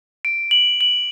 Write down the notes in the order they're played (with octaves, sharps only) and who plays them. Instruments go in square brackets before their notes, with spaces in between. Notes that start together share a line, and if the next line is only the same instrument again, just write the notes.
[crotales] D7
F#7
F#7